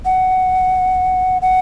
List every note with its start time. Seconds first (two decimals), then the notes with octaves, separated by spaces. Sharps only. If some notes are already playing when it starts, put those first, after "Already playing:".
0.05 F#5
1.42 F#5